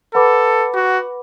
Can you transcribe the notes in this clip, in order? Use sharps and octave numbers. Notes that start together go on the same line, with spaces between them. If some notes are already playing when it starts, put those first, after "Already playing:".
A4 B4 F#5 B5 D6
F#4